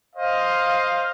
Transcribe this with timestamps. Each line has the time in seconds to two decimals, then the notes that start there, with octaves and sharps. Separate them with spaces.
0.16 C5 D#5 F5